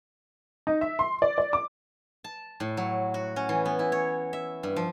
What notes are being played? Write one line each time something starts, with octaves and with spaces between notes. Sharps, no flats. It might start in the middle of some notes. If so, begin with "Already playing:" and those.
D#4
E5
C6
D5
D5
D6
A5
A2
F#3
F#4
C#4
E3
B3
E4
C#5
E5
G2
F3